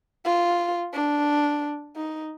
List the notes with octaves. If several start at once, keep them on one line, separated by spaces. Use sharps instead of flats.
F4
D4
D#4